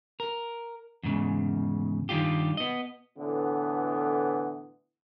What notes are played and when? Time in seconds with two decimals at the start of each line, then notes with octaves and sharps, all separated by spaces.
0.20 A#4
1.03 E2 G#2 C#3
2.09 G2 D#3 G3 F4 G4
2.57 B3 D#5
3.18 A2 D3 E3 B3